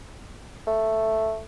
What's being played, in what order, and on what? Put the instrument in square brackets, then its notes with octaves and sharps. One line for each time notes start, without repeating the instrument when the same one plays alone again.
[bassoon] A3